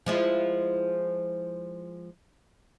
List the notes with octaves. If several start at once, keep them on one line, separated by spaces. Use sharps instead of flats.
F3 G#3 E4